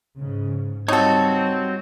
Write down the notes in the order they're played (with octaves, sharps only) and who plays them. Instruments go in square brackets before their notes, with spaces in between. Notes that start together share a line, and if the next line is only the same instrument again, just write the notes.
[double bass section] G#2 C#3
[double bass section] G3 [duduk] C4 [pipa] D#4 A4 [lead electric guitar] F#4 C#5